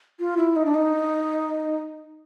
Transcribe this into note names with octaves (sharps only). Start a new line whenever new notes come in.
F4
E4
D#4
D4
D#4